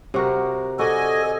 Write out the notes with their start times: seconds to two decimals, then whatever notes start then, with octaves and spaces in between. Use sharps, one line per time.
0.14 C3 F#4 A#4
0.79 F#4 A4 D5 D#5 G#5